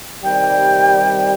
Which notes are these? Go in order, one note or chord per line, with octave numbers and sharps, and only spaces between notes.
C3 D#3 G3 G5